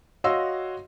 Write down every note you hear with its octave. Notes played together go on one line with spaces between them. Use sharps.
F#4 C#5 D#5 F5 C6 E6